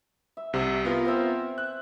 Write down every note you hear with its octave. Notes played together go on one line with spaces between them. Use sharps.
E5
C2 C3
B3 F4 A#4 G#5
C4 E5
F#6